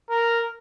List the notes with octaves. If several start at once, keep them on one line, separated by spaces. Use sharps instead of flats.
A#4